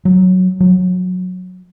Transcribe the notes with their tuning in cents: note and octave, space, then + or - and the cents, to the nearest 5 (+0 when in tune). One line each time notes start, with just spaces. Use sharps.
F#3 -5
F#3 -20